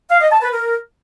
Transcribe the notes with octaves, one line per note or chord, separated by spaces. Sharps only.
F5
D#5
A5
B4
A#4